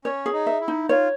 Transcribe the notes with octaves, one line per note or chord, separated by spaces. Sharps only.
C#4 C#5
G#4
D#4
E5
E4
D#4
F4 C#5